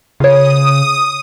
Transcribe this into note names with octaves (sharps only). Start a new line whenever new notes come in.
C#3 F4 C#5 D#6